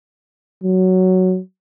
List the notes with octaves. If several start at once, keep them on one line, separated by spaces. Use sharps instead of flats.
F#3